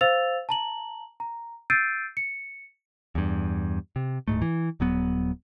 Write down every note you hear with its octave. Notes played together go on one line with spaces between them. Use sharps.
C5 F5 E6 A6 F7
A5 A#5 F#7
A#5
E6 G6 A6 C7 D7 D#7
C#7
E2 G2
C3
D1 G#1 G#2 A3
E3
D#1 F#3 B3